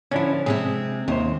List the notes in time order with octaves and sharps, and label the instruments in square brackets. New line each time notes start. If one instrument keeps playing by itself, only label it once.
[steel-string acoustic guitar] D3 F3 [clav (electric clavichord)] C#4 D4 E4
[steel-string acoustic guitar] C3 G#3 C4 [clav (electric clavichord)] G#4
[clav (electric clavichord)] D#2 C5 [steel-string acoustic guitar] C3